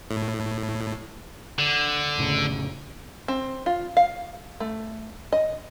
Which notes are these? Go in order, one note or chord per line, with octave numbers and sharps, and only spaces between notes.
A2
D3
F1 A2 C#3
C4
F4
F5
A3
D#5